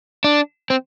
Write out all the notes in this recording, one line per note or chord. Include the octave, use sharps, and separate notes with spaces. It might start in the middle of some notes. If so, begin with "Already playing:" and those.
D4
C4